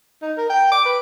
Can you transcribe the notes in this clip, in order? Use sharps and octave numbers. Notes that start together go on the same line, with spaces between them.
D#4
A#4
G5
D6
B4